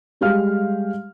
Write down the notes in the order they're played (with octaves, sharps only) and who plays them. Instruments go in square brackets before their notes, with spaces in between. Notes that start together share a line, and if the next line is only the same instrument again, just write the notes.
[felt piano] G3 G#3 G4 F5 F6